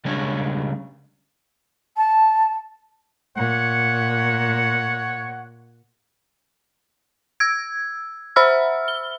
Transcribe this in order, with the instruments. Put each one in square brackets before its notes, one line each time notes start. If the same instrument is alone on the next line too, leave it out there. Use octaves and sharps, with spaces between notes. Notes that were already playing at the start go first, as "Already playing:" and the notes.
[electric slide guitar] C#3 G3 G#3 C#4 D4 C#5
[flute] A5
[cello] A#2 [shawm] C#5 [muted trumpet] F#5
[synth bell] E6 G#6
C5 E5 B5 E6 F6
G7